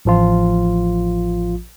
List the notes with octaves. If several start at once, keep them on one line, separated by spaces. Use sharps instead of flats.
A1 F3 F4